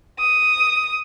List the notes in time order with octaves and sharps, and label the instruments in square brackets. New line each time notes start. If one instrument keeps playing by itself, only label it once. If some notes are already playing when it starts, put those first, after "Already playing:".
[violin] D#6